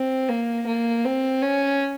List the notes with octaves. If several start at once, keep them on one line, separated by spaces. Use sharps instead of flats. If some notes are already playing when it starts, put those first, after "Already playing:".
Already playing: C4
A#3
A#3
C4
C#4